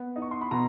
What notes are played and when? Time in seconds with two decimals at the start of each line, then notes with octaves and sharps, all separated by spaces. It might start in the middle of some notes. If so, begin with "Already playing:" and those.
Already playing: B3
0.16 D#4
0.22 C#6
0.31 C6
0.41 B5
0.51 B2 A#5